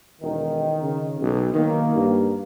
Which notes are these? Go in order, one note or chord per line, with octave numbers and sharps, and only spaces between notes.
E1 D#3
C#3
B1
D#3 A#3
G2